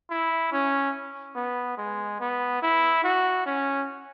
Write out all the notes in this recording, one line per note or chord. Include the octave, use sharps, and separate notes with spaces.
E4
C#4
B3
G#3
B3
E4
F#4
C#4